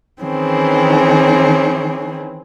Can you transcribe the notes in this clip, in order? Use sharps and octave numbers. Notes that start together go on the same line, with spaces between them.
D#3 E3 C4 C#4 G#4